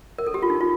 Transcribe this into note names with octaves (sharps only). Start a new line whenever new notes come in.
A#4
A4
G4
F4
D#4
F4